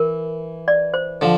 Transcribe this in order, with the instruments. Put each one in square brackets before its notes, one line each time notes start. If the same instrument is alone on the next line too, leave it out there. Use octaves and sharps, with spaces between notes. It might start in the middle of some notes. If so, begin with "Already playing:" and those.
Already playing: [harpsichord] E3 [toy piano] A#4
[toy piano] D5
C5
[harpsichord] D3 F3